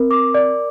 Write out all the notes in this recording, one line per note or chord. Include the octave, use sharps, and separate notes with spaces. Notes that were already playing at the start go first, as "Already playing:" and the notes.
Already playing: C4 A#4
D6
D5